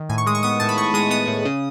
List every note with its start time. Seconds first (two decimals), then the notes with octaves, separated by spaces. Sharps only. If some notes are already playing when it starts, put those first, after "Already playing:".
Already playing: D#3
0.09 A2 G#5
0.18 C#6
0.26 G#3 D#6
0.35 C#6
0.43 B3 D#6
0.60 A2 A5
0.69 B5
0.77 A2 C#6
0.94 G#3 D#6
1.10 B3 D#6
1.27 A2
1.45 C#3